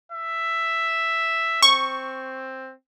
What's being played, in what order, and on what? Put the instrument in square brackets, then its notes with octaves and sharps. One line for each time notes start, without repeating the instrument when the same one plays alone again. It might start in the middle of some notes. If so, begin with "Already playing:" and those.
[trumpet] E5
[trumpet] C4 [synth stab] C#6